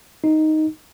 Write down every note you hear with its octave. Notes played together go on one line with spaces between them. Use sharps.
D#4